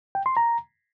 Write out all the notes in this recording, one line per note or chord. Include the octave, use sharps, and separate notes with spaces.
G5
C6
A#5